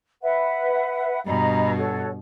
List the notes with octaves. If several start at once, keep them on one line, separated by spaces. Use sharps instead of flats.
B4 E5 F#5
G2 B2 D#5 A#5 B5
F#4 A4 C#5